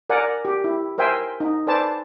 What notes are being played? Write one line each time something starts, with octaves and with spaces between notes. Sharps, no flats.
A#4 D5 F#5 G#5
G4
E4
A#4 C5 E5 G5 G#5 C6
D#4
A4 B4 C5 D5 G#5 A5